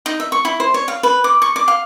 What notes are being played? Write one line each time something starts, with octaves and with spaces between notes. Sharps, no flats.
D#4
E5
C#6
E4
C5
C#5
F5
B4
D6
C#6
D6
F5